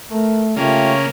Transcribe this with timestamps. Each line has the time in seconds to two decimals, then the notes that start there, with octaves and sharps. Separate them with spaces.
0.10 A3 A#4
0.56 C#3 A3 A#3 F4 G4 C#5